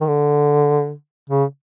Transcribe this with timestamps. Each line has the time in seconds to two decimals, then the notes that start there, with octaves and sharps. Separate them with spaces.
0.01 D#3
0.07 D3
1.30 C#3